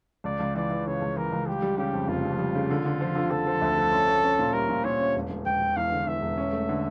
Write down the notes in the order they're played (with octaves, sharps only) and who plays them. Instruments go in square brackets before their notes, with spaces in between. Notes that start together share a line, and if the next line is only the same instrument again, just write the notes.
[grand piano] C#2 [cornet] D5
[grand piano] C#2
[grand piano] E3 [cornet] D5
[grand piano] E3
[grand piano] C#3 [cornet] C#5
[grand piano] C#2
[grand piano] E3 [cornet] A#4
[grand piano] C#2
[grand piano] G3 [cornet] G4
[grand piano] G3
[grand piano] C#3 [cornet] G4
[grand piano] F2
[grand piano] F1 [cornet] F4
[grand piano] F2
G3
C#3
D3
D3
F3
D3
[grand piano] F3 [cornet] A4
[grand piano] F3
D2
F3
C#4
C#4
C#4
A#2
[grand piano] G3 [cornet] A#4
[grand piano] A#2
[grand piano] A#2 [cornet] C#5
[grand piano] C#4
E1
E1
[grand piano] E1 [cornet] G5
[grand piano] E1
[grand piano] E2 [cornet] F5
[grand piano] D3
[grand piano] E2 [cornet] E5
[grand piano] E1
C#4
A3
D3